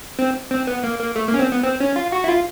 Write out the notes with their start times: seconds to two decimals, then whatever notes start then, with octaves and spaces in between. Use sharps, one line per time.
0.19 C4
0.51 C4
0.67 B3
0.83 A#3
0.99 A#3
1.16 A3
1.28 A#3
1.34 C#4
1.39 C4
1.52 B3
1.64 C4
1.80 C#4
1.96 F4
2.12 F#4
2.24 E4
2.28 F4